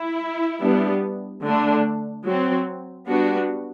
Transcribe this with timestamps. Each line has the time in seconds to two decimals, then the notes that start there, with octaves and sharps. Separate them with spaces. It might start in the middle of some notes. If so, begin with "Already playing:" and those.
Already playing: E4
0.61 G3 B3 D4
1.43 D3 A3 D4
2.26 F#3 C4
3.07 G3 B3 D4 F#4